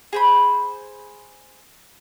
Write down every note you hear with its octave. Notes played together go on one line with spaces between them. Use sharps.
G#4 C5 B5